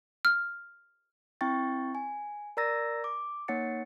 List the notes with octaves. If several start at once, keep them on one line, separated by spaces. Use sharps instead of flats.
F6
C4 E4 G5 C#6 A6
G#5
A#4 D5 A#5 E6 A6 A#6
D6
A#3 D#4 C#5 F#5 A6 C#7